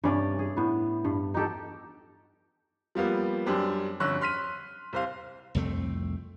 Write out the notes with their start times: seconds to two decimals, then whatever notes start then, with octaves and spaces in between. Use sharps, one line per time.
0.04 G2 C3 C#4 D5
0.39 G#4
0.57 A2 B3
1.04 G2
1.34 D#4 F#4 G4 A4
2.95 F3 G3 A#3 B3
3.46 F#2 G3 D4 G4 C5
4.00 G1 F2 C#4 C#6 E6 F#6
4.21 C6 F6 B6 D#7
4.93 C2 C5 F5
5.55 C2 F2 A3 C4